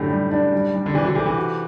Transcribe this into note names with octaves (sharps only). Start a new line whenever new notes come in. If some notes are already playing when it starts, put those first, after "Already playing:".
Already playing: F#2 A2 D3 G4
G3
D4
G3
G3
D3
C3 E3 D4
D3 F#3
C3 E3 A4
C3 E3
F#4